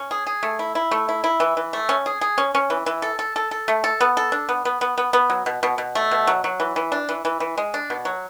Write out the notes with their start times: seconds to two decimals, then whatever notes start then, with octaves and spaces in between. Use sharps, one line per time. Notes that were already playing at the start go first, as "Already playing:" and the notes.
Already playing: C#4
0.11 G#4
0.27 G#4
0.43 A3
0.59 E4
0.75 E4
0.91 A3
1.09 E4
1.24 E4
1.40 E3
1.57 E3
1.73 A3
1.89 C#4
2.06 G#4
2.21 G#4
2.38 C#4
2.55 C#4
2.70 E3
2.86 E3
3.02 A4
3.19 A4
3.36 A4
3.51 A4
3.68 A3
3.84 A4
4.01 B3
4.17 A4
4.32 D4
4.49 B3
4.65 B3
4.81 B3
4.98 B3
5.13 B3
5.30 F#3
5.46 B2
5.63 B2
5.78 B2
5.95 A3
6.11 B2
6.27 F#3
6.44 F#3
6.60 E3
6.76 E3
6.92 D4
7.09 E3
7.25 E3
7.40 E3
7.58 G#3
7.74 D4
7.90 B2
8.05 F#3